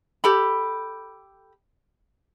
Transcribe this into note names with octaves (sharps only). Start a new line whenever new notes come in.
G4 A4 B5